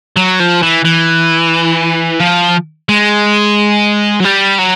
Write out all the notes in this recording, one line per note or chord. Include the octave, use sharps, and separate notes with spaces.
F#3
F3
E3
E3
F3
G#3
F#3
G3
F#3